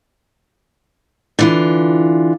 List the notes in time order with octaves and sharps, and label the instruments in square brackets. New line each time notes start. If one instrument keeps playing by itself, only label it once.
[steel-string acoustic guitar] D3 E3 F4